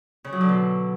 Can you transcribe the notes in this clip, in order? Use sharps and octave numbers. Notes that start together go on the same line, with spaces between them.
C#3
F#3
D3
B2